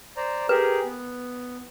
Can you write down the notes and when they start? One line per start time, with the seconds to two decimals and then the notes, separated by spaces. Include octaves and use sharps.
0.17 C5 D5 A#5
0.49 G4 G#4 A#4 B4
0.85 B3